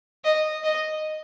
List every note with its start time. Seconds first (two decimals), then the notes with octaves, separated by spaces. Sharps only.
0.25 D#5
0.64 D#5